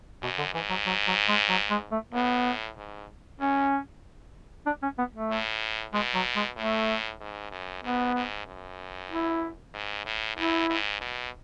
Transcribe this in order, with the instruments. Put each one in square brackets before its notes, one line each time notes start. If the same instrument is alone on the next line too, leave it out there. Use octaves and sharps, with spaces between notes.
[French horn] F#2 [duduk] B2
[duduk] D3
[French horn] G#2 [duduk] E3
[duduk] F#3
F#3
F#3
G#3
F#3
G#3
A3
[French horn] A2 [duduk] B3
[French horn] G#2
[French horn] F#2 [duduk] C#4
[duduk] D4
C#4
B3
A3
[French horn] A2
[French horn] B2 [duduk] G#3
[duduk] F#3
G#3
[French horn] A2 [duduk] A3
[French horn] G#2
F#2
[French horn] G#2 [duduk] B3
[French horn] G#2
F#2
[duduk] E4
[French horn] G#2
A2
[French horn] F#2 [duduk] E4
[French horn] G#2
B2